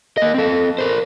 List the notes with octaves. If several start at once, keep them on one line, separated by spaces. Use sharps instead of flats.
A#3 D#5
C4 A4
A#4 C5